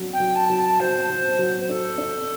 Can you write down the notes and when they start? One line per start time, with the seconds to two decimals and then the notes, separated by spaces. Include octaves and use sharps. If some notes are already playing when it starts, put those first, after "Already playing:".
Already playing: F#3 D4
0.13 G5
0.20 F#3
0.35 A5
0.50 F#3
0.57 A5
0.80 F#3 C5
1.10 F#3
1.39 F#3
1.69 D4 A4
1.98 D4